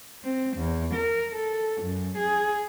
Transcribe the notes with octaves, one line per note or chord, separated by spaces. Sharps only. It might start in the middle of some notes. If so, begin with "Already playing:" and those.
C4
E2
A#4
A4
F#2
G#4